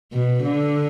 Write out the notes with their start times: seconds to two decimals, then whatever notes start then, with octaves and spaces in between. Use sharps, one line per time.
0.13 B2
0.43 D3